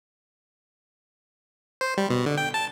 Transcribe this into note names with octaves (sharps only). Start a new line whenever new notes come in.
C5
G3
B2
D3
G5
A5